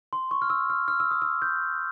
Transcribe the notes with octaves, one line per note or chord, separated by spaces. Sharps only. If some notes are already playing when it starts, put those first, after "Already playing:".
C6
C#6
F6
E6
F6
F6
E6
D#6
E6
G6